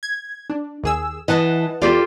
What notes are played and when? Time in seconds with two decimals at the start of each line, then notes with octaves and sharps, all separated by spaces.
0.03 G#6
0.50 D4
0.83 D#2 G#4 E6
1.28 E3 D#5 F#5 A5
1.82 E2 F4 G4 A4 D5